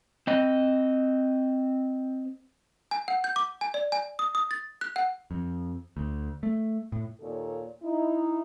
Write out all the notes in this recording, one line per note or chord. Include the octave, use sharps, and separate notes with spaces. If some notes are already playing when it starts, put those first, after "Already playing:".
C4 D#5
G#5
F#5
G6
D6
G#5
D5
G#5
D#6
D#6
A6
F#6
F#5
F2
D2
A3
A2
D#2 A#2 A#3 A4 C#5
D#4 E4